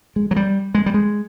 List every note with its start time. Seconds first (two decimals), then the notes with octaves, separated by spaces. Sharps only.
0.16 G#3
0.31 F#3
0.36 G3
0.75 G#3
0.86 G3
0.94 G#3